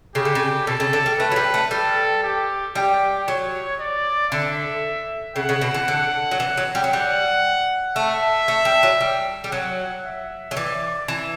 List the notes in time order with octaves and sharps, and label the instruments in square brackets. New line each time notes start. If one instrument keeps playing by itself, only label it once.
[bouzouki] C#3 [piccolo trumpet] G4
[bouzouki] D3
C#3
[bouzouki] B2 [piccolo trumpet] A4
[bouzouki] C#3
D3
G3
[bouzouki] A3 [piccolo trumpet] B4
[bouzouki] F#3
G3
A3
[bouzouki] G3 [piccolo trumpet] A4
[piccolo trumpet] G4
[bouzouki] G3 [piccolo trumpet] G4
[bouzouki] F#3 [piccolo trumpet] C#5
[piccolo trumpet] D5
[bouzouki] D3 [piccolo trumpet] E5
[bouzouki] C#3 [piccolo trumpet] F#5
[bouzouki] C#3
B2
E3
D3
F#3
E3
F#3
G3
F#3
[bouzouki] G3 [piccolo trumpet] F#5
[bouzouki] A3 [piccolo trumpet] E5
[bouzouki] A3
G3
F#3
G3
G3
[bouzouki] F#3 [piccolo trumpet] F#5
[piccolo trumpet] E5
[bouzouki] F#3
[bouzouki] E3 [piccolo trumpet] D5
[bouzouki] E3